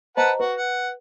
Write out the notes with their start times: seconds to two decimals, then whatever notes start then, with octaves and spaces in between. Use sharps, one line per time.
0.17 B4 C5 D#5 F#5 A5 A#5
0.39 F#4 B4
0.57 F#5